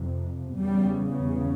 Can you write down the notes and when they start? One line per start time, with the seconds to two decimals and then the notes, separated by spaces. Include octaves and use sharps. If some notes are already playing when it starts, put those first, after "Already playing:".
Already playing: F2 C3
0.57 E2 C#3 G3